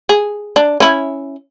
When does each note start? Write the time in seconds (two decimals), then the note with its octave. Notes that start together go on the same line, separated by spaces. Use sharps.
0.09 G#4
0.56 D4
0.80 C#4 E4